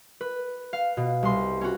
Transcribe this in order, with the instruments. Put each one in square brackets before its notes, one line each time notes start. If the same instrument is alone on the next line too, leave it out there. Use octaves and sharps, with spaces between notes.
[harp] B4
F5
B2
C2 C6
C#4 F#4